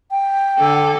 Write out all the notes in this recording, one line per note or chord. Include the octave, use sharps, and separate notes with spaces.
G5
D3 A4